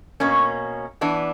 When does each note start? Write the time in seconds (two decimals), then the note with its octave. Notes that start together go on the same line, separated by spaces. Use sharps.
0.20 B2 A#3 C#4
1.01 E3 B3 D4